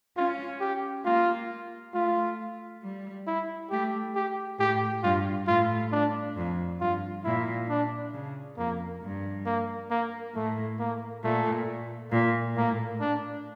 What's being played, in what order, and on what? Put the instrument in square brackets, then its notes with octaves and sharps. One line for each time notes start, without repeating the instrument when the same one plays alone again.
[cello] C#4 [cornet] F4
[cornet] G4
[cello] A#3 [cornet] F4
[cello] A3 [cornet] F4
[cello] G3
[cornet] E4
[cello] A3 [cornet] G4
[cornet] G4
[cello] A2 [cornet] G4
[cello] G2 [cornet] F4
[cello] A2 [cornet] F4
[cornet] D4
[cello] F2
[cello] G2 [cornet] F4
[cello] A#2 [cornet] E4
[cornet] D4
[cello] C#3
[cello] F2 [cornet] A#3
[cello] G2
[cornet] A#3
A#3
[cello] A2 [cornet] A3
[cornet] A#3
[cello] A#2 [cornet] A3
[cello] A#2 [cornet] A#3
[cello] A2 [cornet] A#3
[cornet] D4